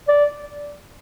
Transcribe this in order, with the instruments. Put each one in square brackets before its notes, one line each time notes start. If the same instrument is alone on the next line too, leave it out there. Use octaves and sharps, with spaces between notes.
[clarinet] D5